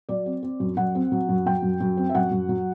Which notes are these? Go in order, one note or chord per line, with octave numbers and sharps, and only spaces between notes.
F#3 D5
C4
C4
F#2
F#2 F#5
C4
F#3
F#2
F#3 G5
F#2
F#2
C4
E5
F#2 F#5
F#2
F#3